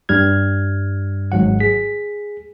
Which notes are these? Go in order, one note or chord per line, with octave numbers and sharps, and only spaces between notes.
G2 G3 F6 G#6
G#1 G#2 F#3 F#5
G#4 B6